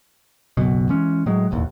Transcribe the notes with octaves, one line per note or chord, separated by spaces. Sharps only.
F#1 B1 B2
E3 G#3 C#4
A2 F#3 G#3
E1 A1 D#2